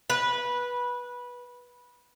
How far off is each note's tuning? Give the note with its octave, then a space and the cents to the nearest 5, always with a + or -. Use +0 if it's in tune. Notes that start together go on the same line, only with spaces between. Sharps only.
B4 -15